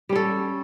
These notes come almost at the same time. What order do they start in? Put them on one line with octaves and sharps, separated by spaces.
G3 C#4 A4